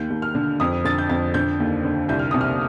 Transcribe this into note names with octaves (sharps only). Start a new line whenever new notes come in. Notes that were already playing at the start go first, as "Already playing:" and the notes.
Already playing: D#2 G6
D#2
F6
D3
F2 D#6
D3 A6
G6
F2 A6
D3 G6
D#2
D3
C2 G6
F6
C3 D#6
F6